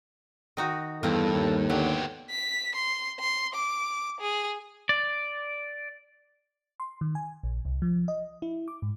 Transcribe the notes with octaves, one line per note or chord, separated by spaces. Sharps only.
D#3 D#4 F#4
E2 G2 A#3 C4 A4
D#2
D3 F#3 B3 G4
B6
C6
C6
D6
G#4
D5
C6
D#3
G#5
A#1
C2
F3
D#5
E4
D6
G#2